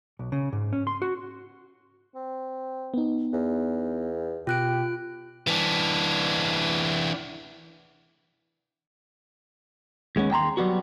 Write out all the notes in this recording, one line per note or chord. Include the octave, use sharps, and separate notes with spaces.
B1
C#3
G#2
C#4
C6
F#4
C4
B3 D#4
E2
B2 F4 G4 F#6 D7
E3 D4
D#2 G#3 B3 C#4
D#2 G5 A5 A#5 C6
F#3 G3 B3 F#4